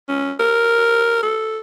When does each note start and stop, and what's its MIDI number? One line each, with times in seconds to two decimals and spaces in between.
0.09 0.34 61
0.40 1.20 70
1.23 1.60 69